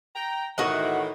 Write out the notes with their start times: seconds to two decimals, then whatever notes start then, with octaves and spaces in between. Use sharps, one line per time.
0.15 G5 A#5
0.58 A2 D#3 E3 F#4 D#5 F#5